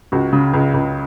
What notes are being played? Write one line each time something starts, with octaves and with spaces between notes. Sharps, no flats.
C#2 F#4
C#3
C#2
C#2